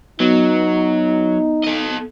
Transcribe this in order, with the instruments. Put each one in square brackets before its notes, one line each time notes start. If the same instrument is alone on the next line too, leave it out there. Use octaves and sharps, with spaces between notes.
[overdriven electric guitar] F#3 [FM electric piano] B3 [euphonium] D#4
[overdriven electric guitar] A4 D#5